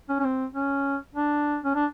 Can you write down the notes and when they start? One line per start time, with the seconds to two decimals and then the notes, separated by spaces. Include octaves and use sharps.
0.09 C#4
0.20 C#4
0.24 C4
0.54 C#4
1.15 D4
1.64 C#4
1.75 D4